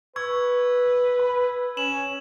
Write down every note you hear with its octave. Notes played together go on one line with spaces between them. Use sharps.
B4 C#6 E6 G#6
B5
C#4 E7 F#7